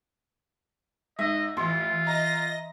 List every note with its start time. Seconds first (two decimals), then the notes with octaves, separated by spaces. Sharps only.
1.19 G#2 D#5 E5
1.57 A1 E3 F4 C6
2.07 D#5 A#5 A#6